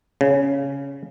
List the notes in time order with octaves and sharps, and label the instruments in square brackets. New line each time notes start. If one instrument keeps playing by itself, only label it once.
[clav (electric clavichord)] C#3